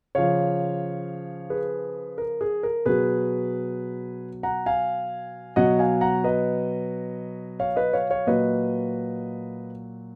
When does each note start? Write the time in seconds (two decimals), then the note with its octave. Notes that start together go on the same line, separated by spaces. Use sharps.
0.15 C#3 F3 C#5 F5
1.50 G#4 B4
2.18 A#4
2.41 G#4
2.63 A#4
2.86 B2 F#3 G#4 B4
4.43 F#5 A#5
4.66 F5 G#5
5.56 B2 F#3 D#5 F#5
5.79 F5 G#5
6.01 F#5 A#5
6.24 B4 D#5
7.60 C#5 F5
7.76 B4 D#5
7.93 C#5 F5
8.10 C#5 F5
8.27 A#2 F#3 B4 D#5